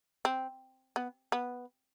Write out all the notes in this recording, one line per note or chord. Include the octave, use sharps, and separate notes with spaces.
C4
B3
B3